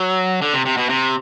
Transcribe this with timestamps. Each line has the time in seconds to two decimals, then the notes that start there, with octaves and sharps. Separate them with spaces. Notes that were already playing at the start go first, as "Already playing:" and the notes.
Already playing: F#3
0.42 D3
0.53 C3
0.65 C3
0.77 B2
0.89 C3